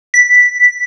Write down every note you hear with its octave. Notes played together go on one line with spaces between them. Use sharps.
B6